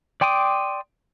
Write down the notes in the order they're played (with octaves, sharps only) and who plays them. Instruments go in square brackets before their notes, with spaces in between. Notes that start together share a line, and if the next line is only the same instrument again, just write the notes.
[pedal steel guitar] D5 G5 C6 D6 D#6